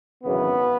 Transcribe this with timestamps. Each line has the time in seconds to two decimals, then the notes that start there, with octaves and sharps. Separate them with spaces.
0.23 G#1 F#2 C#3 E3 B3